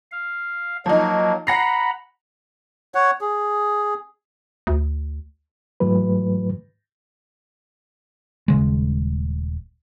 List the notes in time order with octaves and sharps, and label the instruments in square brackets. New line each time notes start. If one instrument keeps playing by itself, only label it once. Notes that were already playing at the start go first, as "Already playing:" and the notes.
[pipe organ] F5
[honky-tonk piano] F3 D#4 [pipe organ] F#3 A#3
[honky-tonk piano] F#5 A#6 C7 [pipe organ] A#5 B5
[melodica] C#5 F#5
G#4
[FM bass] D2
[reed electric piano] G#2 E3 F#3 A3 B4
[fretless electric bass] D#1 C#3 G#3